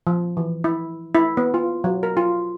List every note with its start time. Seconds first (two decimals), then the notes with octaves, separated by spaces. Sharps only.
0.07 F3
0.37 E3
0.64 E4
1.15 E4
1.37 B3
1.54 F4
1.84 F#3
2.03 A#4
2.17 F4